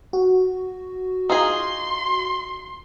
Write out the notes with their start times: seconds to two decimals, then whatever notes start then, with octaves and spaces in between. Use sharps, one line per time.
0.13 F#4
1.29 D#4 F4 G#4 C6